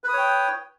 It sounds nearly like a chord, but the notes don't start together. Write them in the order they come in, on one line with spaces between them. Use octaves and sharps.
B4 D#6 C#5 G5